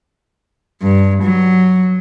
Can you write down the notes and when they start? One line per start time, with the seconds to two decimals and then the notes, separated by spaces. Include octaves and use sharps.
0.82 G2
1.23 F#3